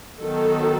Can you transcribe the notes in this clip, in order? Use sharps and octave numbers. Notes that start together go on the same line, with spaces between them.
D#3 F#3 B3 A4